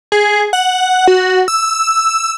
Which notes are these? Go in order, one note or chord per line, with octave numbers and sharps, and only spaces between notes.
G#4
F#5
F#4
E6